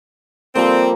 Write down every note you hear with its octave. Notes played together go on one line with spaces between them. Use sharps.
F3 G3 A#3 C4